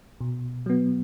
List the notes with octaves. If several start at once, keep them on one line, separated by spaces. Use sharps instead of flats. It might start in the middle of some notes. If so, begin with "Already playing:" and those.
B2
F#3 B3